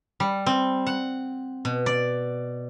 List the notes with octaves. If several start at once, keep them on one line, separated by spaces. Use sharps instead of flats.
G3
C4
F#5
B2
D5